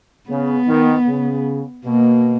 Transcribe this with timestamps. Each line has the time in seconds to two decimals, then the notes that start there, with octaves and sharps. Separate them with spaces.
0.29 C#3 B3
0.68 D#3
1.08 C#3
1.85 B2 A#3